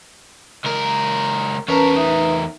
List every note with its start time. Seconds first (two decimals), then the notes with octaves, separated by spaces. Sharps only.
0.64 C#2 A#4
1.68 E2 C#4 A#4 B4 A5
1.96 D#4 B4 E5